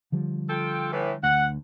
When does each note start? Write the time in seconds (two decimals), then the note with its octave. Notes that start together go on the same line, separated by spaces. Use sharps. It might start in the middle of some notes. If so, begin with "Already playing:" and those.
0.12 D3 F3 G3
0.49 F4 A4 G5
0.92 A2 E3
1.23 D2 F#5